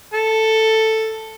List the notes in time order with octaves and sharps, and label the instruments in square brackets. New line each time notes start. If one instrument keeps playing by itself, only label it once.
[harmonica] A4